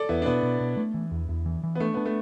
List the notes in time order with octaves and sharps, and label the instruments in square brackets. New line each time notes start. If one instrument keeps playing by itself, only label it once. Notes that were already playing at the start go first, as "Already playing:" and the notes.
Already playing: [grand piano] A4 D5
[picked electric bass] E2 [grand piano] B3 E4
[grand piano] D4
[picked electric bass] B2 [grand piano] B3
[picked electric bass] B2
B2
A3
E3
E2
E2
E3
E3
[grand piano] B3
[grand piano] A3 [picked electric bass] D4
[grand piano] B3 [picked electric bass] D4
[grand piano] A3